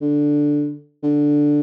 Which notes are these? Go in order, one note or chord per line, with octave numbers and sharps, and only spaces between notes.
D3
D3